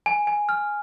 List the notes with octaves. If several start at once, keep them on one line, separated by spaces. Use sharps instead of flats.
G#5
G#5
F6